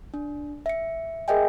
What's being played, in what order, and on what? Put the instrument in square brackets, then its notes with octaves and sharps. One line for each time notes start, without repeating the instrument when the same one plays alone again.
[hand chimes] D4
E5 C#7
G#4 A#4 D#5 E5 G5 G#5